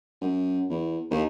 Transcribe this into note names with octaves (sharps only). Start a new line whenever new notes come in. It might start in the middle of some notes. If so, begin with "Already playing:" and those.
F#2
E2
D#2